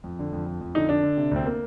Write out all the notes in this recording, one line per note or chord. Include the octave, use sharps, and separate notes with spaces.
F2
D3
F2
F2
F2
D3 D#4
D3 D4
D3
C3
D2 C4
A#3